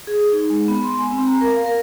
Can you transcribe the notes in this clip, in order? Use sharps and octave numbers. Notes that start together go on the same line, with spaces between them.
G#4
D#4
G#3
B3
C6
G#5
C4
A#5
A#4
F5
A#4